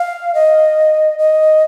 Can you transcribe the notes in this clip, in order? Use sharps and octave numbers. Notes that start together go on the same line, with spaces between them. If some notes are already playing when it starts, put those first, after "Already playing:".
Already playing: F5
D#5
D#5